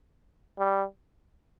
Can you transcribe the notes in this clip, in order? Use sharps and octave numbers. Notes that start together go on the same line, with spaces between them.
G3